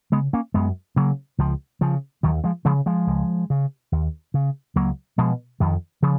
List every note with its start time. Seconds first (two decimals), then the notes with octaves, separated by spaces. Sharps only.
0.12 C#3 G#3 B3
0.33 A#3 C#4
0.54 F#2 G#3 B3
0.96 C#3 F#3 A#3
1.38 C#2 F3
1.81 C#3 F3
2.23 D#2 D#3 F#3
2.44 F3 G#3
2.65 C#3 F3 G#3
2.86 F3 G#3
3.07 C#2
3.50 C#3
3.92 D#2
4.34 C#3
4.76 C#2 F#3 A#3
5.18 B2 F3 G#3
5.60 F2 D#3
6.02 C#3 F3